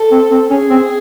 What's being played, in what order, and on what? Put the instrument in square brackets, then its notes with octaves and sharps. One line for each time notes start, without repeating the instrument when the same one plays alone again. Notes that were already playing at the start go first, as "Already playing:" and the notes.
Already playing: [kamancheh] A4
[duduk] C4
C4
[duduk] C#4 [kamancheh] G#4
[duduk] C4